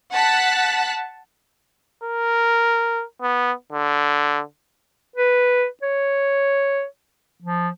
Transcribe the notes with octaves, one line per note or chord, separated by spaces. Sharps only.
F#5 A5 F#6 B6
A#4
B3
D3
B4
C#5
F3